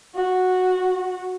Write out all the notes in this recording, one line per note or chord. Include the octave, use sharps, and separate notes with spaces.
F#4